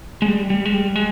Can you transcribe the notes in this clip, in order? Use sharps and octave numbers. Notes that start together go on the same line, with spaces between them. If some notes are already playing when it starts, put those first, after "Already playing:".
G#3
G3
G3
G#3
G3
G#3